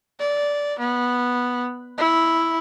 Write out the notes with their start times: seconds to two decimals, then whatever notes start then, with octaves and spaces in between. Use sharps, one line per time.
0.19 D5
0.79 B3
1.98 E4